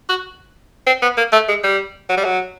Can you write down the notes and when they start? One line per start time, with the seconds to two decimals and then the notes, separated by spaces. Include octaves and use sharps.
0.09 F#4
0.87 C4
1.02 B3
1.17 A#3
1.32 A3
1.48 G#3
1.64 G3
2.09 F#3
2.17 G3
2.24 F#3